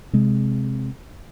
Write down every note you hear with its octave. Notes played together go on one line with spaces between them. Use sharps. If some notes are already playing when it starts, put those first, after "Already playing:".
C3 G#3